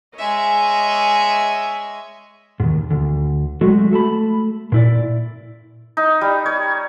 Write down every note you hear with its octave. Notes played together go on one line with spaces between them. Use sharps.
G#3 C#5 D#5 E5 G#5
D#2 G#2
D2
F#3 G#3 A3 F#4
A3 A4 A5 B5
A#2 E4 D5
D#4
G3
C#5